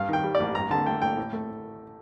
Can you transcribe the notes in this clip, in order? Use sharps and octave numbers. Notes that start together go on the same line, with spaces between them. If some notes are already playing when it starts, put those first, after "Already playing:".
Already playing: G2 F5
D#3 G5
G3
D5
A1
G2 A#5
D3 A5
A3 G5
A1 G5
A2
A3